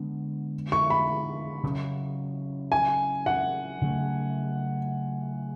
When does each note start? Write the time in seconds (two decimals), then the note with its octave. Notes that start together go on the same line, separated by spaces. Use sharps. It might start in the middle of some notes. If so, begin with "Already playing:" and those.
Already playing: D3 G#3 B3 D4
0.72 C#6
0.90 B5
1.63 C#3 F#3 C#4
2.72 G#5
3.26 F#5
3.81 C#3 F#3 A3